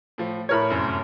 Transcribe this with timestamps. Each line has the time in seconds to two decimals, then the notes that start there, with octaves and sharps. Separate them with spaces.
0.18 A2 F3
0.49 A2 A#4 C#5 B5 F6 G#6
0.70 F1 F#2